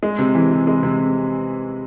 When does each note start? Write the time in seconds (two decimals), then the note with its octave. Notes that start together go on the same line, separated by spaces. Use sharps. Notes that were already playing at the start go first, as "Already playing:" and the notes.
0.03 G#3
0.19 C3
0.35 E3
0.51 C3
0.67 G#3
0.83 C3